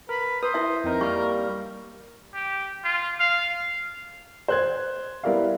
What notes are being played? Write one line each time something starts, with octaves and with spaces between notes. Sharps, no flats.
A#4 B4
B4 C5 D#6
E4 E5
F2 C4 D#4 A#4
G3 A#3 C#6 F6
G4
F4
F5
C5 F#6 G#6
G3 B3 E4 A#4 D5 F5